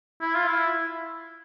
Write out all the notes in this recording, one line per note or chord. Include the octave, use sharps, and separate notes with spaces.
E4
F4
E4